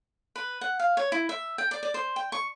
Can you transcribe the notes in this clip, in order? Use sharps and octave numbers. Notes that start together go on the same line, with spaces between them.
B4
F#5
F5
C#5
E4
E5
G5
D5
D5
C5
G5
C#6